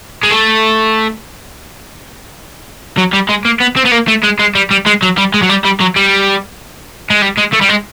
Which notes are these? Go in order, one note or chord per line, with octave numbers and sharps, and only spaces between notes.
G#3
A3
F#3
G3
G#3
A#3
B3
C4
B3
A#3
A3
G#3
G#3
G3
G3
G#3
F#3
G3
G#3
F#3
G3
G3
F#3
G3
G#3
G3
G#3
A3
G3
G#3